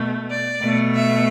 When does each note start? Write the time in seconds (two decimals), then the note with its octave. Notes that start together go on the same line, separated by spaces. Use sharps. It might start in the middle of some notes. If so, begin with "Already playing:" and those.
Already playing: B2 A3
0.31 D5
0.62 B2 A3
0.95 E5